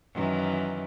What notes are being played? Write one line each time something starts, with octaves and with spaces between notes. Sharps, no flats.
F#2 D#3 E3